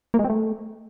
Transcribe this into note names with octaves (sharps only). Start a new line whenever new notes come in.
A#3
G#3
C4
A3